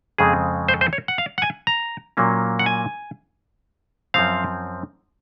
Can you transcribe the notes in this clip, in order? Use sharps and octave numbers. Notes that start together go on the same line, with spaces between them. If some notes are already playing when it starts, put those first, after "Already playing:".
F2 C#3 G#3 C4 G#4
C5
C5
C#5
F#5
F5
F#5
G#5
A#5
A#2 F#3 A#3 C#4
F#5
G#5
F#2 F3 C4 F5